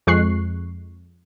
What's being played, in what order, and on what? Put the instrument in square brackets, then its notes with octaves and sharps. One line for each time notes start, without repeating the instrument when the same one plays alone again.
[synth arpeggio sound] F2 G#3 C#6 F#6 C7